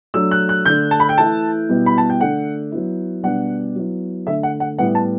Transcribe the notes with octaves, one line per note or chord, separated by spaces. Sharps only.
F#3 A3 D4 E6
F#6
F#6
D3 A3 D4 G6
A5
B5
G5
E3 A3 E4 A5
B2 G3 B3 E4
B5
A5
G5
D3 A3 D4 F#5
F#3 B3 E4
B2 G3 B3 D4 F#5
F#3 B3 E4
D3 A3 D4 E5
F#5
F#5
A2 G3 B3 E4 F#5
A5